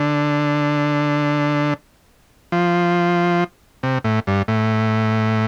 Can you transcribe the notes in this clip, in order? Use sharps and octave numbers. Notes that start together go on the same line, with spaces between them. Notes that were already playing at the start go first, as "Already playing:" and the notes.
Already playing: D3
F3
C3
A2
G2
A2